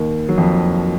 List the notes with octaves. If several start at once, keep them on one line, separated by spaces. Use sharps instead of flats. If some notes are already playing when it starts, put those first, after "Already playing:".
Already playing: D#2 D#3
F#3
F2 F3